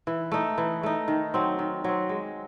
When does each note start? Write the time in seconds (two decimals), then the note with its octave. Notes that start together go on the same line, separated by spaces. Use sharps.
0.07 E3
0.31 A3 D#4
0.58 E3
0.83 A3 D#4
1.08 D#3
1.34 F#3 C4
1.59 D#3
1.84 F#3 C4
2.09 G#3